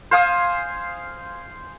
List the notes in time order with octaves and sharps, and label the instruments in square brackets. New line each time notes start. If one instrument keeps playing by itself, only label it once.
[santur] C5 F5 G#5 D#6